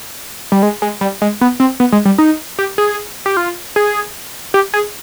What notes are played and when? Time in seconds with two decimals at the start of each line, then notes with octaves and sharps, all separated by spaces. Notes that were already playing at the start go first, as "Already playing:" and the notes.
0.52 G3
0.63 G#3
0.82 G#3
1.01 G3
1.22 G#3
1.41 B3
1.60 C4
1.80 B3
1.92 G#3
2.05 G3
2.18 D#4
2.59 G4
2.78 G#4
3.26 G4
3.37 F4
3.76 G#4
4.54 G4
4.74 G#4